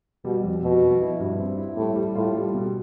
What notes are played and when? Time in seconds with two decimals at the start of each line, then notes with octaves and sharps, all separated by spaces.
0.25 B2 G3
0.43 F2
0.63 F2 B2
0.82 F2
1.01 E4
1.20 G2
1.39 C4
1.58 E4
1.77 A2 G3
1.96 G3
2.15 A2 F4
2.35 G3
2.54 B2